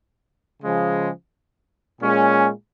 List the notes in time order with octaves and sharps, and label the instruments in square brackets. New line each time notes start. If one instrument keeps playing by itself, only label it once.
[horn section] C#3 F3 G#3
A#2 G#3 C#4 G#4